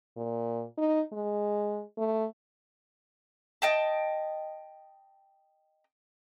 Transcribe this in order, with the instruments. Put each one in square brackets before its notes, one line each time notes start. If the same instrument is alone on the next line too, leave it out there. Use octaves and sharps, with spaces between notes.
[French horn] A#2
D#4
G#3
A3
[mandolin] D#5 G5 A5